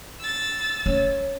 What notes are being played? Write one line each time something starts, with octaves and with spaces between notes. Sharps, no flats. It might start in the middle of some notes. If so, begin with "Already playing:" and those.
E6 A6
C#4 C#5